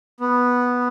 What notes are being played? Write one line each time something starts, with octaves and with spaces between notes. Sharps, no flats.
B3